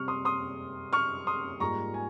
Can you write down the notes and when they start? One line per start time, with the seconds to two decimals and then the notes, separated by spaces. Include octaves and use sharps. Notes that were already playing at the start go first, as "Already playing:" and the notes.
Already playing: C3 G3 C4 C#6 F6
0.08 C6 D#6
0.25 C6 D#6
0.93 C#6 F6
1.27 C6 D#6
1.60 G#2 G3 A#3 F4 A#5 C#6
1.94 G#5